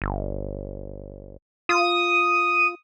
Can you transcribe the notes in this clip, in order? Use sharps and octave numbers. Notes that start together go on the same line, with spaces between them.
G1
F4 D#6